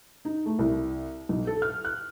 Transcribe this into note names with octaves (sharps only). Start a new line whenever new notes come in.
D#4
A3
C2
B1
A4
F6
F#6